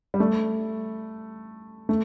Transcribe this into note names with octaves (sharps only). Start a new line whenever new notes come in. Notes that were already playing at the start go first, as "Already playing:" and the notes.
G3
A3
A3